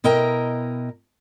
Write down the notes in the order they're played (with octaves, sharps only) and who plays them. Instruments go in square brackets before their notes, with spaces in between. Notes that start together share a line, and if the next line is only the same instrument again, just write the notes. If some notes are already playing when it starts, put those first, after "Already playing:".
[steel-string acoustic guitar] B2 E4 A#4 D#5 G5 A#5